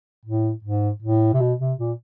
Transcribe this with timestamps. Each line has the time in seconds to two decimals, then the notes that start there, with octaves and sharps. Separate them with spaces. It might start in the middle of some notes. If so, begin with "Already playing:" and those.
0.25 A2
0.64 G#2
1.02 A2
1.33 C3
1.40 B2
1.59 C3
1.79 A#2